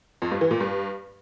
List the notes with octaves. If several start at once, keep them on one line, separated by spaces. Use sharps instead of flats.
F2
G2
E3
A#2
G2